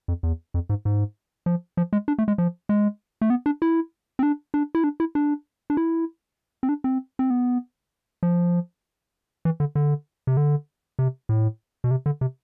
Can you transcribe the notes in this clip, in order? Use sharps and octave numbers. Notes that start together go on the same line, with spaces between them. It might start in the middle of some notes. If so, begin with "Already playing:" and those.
F2
E2
F2
G#2
G#2
F3
F3
G#3
D4
A3
G#3
F3
G#3
A3
B3
D4
E4
C4
D4
D4
E4
D4
E4
D4
D4
E4
C4
D4
C4
C4
B3
F3
E3
D3
D3
C3
D3
C3
A2
B2
C3
D3
C3